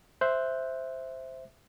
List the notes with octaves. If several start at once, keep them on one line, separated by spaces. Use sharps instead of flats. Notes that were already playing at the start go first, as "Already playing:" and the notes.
C5 E5 F#6 G6